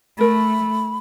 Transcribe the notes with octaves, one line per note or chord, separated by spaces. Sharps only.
A3 A4 A#4 B5